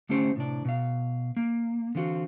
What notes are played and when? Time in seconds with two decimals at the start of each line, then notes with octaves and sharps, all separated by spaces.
0.09 D3 A3 C#4 G4 C5
0.36 A2 C3 D4
0.65 B2 F5
1.37 A#3
1.95 D3 E3 C4 F4 F#4